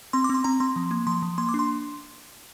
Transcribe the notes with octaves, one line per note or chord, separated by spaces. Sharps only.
C4 C6
D6
C4 C6
C4 A#5
C4 C6
F3
A#3
F3 C6
F3
A#3 C6
D6
D4
C6